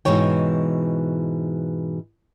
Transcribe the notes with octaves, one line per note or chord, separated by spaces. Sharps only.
G#2 B2 E3 C#5 G5